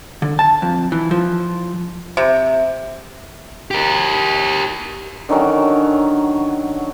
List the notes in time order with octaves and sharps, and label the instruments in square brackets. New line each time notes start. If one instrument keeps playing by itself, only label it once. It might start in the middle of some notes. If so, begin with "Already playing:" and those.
[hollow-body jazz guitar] D3
A5
F2
E3
F3
[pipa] C3
[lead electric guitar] G4 A#4
[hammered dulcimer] D3 D#3 F#3 C#4